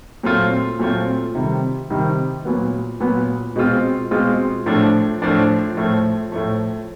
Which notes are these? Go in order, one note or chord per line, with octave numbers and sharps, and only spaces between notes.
A#2 F#3 A3 C4 F4
A#2 F#3 A3 C4 F4
C3 D#3 G3
C3 D#3 G3
A#2 F#3 B3
A#2 F#3 B3
B2 G#3 C4 F4
B2 G#3 C4 F4
A2 F3 A3 D4
A2 F3 A3 D4
A2 F3 A3
A2 F3 A3